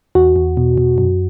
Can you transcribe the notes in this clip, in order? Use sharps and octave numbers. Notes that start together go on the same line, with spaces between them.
E2 F#4
E2
B2
B2
F#2